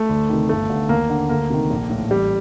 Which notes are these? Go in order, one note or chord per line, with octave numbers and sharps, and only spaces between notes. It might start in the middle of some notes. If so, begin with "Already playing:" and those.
Already playing: A3
D2
C3 D#3
G1 A3
G2 D3
D#2 A#3
D3
D2 A#3
C3 D#3
A#1
A2
A1 G3